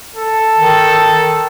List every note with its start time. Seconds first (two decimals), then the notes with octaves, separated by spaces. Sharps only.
0.16 A4
0.58 D#3